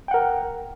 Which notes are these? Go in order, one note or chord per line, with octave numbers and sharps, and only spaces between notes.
A#4 F#5 G5